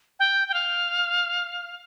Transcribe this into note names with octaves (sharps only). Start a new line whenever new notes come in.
G5
G5
F5